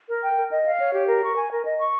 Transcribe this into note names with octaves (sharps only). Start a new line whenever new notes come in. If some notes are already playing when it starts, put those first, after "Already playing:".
A#4
G5
A#4
D#5
F5
C#5
G4
A#4
C#6
G#5
A#4
D#5
C#6